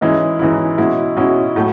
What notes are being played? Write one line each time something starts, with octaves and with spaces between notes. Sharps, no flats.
G#2 E3 G#3 C#4 E4
G#2 E3 G#3 C#4 E4
B2 G#3 C#4 E4
B2 G#3 C#4 E4
A2 F#3 A3